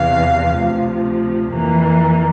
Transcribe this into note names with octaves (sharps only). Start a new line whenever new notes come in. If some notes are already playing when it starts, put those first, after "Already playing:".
Already playing: E2 C3 E3 F5
D2 C3 F3
F2 E3 A#3